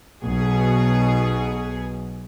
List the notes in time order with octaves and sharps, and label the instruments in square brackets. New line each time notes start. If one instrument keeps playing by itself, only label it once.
[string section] B1 B2 G#4